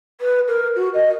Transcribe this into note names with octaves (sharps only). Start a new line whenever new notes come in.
B4
A#4
F#4
D#5